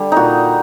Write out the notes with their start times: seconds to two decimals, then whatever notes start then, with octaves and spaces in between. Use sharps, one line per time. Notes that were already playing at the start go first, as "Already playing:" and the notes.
Already playing: D3 G3
0.12 A#2 D#4 F#4